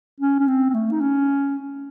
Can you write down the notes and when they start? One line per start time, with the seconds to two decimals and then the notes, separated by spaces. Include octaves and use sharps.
0.20 C#4
0.39 C#4
0.48 C4
0.70 C4
0.74 A3
0.91 D#4
1.01 C#4